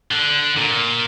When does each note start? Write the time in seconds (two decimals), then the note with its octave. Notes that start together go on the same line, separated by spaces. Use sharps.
0.11 D3
0.57 A#2